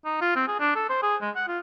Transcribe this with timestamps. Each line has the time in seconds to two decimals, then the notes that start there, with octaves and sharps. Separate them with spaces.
0.05 D#4
0.21 F4
0.36 C4
0.48 G#4
0.60 D4
0.75 A4
0.90 C5
1.03 G#4
1.21 G#3
1.36 F#5
1.48 F4